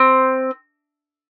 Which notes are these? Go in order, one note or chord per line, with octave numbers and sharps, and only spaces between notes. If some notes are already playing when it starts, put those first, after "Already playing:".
Already playing: C4